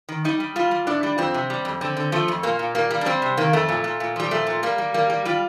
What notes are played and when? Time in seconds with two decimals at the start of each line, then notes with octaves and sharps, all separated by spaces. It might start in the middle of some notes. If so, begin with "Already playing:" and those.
0.09 D#3
0.24 G3 D#4
0.40 G3
0.56 G3 F4
0.71 G3
0.87 A2 D4
1.03 G3
1.18 F2 C4
1.34 C3
1.50 G3
1.65 F2
1.81 D3 C4
1.97 D3
2.12 F3 A3
2.28 F2
2.43 A#2 A#3
2.59 A#2
2.75 G3 A#3
2.91 G3
3.01 D4
3.06 G3 C4
3.22 C3
3.37 D#3 A#3
3.53 F2 A3
3.69 A#2
3.84 A#2
4.00 A#2
4.16 F3 G3
4.31 A#2 A3
4.47 A#2
4.63 G3 A#3
4.78 G3
4.94 G3 A#3
5.10 G3
5.25 G3 F4